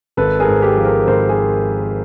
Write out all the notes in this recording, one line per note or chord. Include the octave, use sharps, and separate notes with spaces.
G#1 A4 B4
G#4 A#4
G#2
G4 A4
F3
G#4 A#4
G#1 A#4 C5
G#4